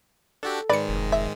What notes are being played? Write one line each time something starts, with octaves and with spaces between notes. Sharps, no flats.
D4 F#4 G4 A4
G#2 D#3 G#3 B4 D5 C#7
F1
E5